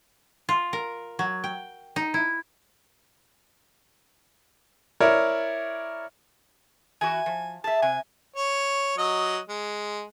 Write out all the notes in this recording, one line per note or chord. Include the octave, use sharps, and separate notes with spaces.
F4
A#4
F#3
G5
D#4
E4
E4 A#4 C#5 D5 E5
E3 F#4 G#5
F3
G#4 E5 A5
C3 G#5
C#5
F#3 D#5
G#3